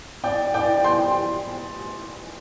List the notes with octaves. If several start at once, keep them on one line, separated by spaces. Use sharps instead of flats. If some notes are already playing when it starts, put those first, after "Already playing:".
D5 G5
D5 G5
G5 C6